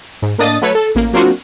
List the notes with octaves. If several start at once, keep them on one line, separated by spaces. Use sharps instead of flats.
G#2
A2 A#3 D4 D#5 D#6 A6
F#3 A3 A4 B4 C#5
A4
A1 A#3
F#3 A#3 C4 D4 F4 F#4